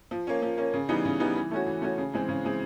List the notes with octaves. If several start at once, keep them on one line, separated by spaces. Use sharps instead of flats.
F3
A#3 C#4
F3
A#3 C#4
C#3
E3 G3 B3 D#4
C#3
E3 G3 B3 D#4
E3
A3 C#4 F#4
E3
A3 C#4 F#4
C#3
E3 G#3 C4
C#3
E3 G#3 C4